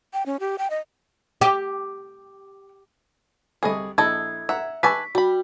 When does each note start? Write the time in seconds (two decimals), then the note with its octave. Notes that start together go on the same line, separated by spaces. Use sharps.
0.13 G5
0.26 C#4
0.40 G4
0.58 G5
0.70 D#5
1.41 G4
3.63 C2 G#4 A4 D#5 B5
3.98 A#1 E4 A4 D#5 G#6
4.49 E5 F#5 A#5 E6
4.83 B4 G#5 A5 C#6 D6 E6 B6
5.15 G3 F#4 B5